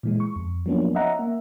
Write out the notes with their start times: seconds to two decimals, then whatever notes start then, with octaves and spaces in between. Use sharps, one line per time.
0.03 A#2 E3 G#3
0.20 C#6
0.36 F2
0.66 F3 F#3 A#3 B3 C#4 D4
0.94 C#4 D#5 E5 F#5 A#5
1.19 A#3 E5